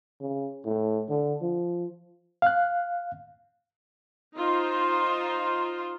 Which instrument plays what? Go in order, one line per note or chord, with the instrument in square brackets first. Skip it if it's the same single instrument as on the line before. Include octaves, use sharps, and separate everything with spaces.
[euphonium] C#3
A2
D3
F3
[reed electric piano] F5 F#6
[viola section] D#4 F4 C5